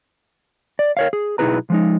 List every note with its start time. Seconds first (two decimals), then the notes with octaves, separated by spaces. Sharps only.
0.79 D5
0.97 A#4 C#5 F5
1.13 G#4
1.38 B1 D#4 E4 G#4 B4 A#5
1.70 F3 G#3 D#4